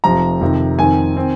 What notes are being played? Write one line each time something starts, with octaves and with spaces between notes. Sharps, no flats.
F1 F2 C3 F3 A#5
F2 C3 D#3
F2 D#3 C4 G#5
D#3 C4